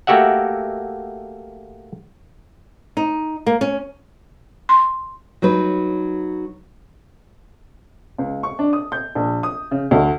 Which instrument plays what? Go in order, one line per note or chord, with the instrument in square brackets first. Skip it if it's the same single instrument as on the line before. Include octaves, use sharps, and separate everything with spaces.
[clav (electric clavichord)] A3 A#3 F#4 G4 E5 F#5
[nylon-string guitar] D#4
A#3
C#4
[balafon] C6
[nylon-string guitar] F#3 D#4 B4
[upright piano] C#2
C#6
D4
D#6
G6
A#1
D#6
C#3
D2